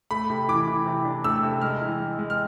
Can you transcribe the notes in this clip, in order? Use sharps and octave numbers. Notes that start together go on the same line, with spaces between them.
A3 B5
C3
E3 D6
E3
C3
D4
A3 E6
C3
G#3 F6
E3
G#3
G#3
F6